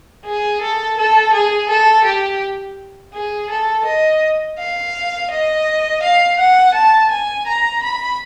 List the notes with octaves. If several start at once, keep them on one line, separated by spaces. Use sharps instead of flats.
G#4
A4
A4
G#4
A4
G4
G#4
A4
D#5
F5
D#5
F5
F#5
A5
G#5
A#5
B5